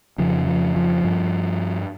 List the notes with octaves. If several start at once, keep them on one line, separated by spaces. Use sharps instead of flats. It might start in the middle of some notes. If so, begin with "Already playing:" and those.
F2 C#3 F3
F3
F3
G2